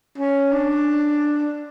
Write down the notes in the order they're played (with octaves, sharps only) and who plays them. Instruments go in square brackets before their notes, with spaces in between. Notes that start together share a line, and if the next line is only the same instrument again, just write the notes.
[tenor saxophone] C#4
D4